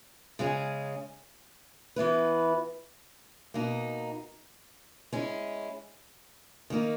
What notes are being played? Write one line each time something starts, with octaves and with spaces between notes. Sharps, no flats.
C#3 G#3 C#4 G#4
E3 B3 E4 B4
B2 A#3 D#4
G#3 C#4 E4
D#3 A#3 D#4